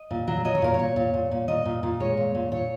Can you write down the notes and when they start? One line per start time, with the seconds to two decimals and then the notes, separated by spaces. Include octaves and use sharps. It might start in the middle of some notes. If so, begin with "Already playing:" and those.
Already playing: D#5
0.11 A#2
0.27 F#3
0.45 F#3 D#5
0.55 C#5
0.62 A#2 A#4
0.74 C#5
0.79 A#2
0.96 A#2
1.14 A#2
1.31 A#2
1.48 A#2 D#5
1.65 A#2
1.83 A#2
2.00 G#3 C#5
2.17 A#2
2.35 A#2
2.52 A#2 C#5